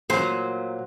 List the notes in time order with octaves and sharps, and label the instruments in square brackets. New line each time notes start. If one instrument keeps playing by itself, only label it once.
[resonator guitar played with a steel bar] A#2 F#3 [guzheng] C5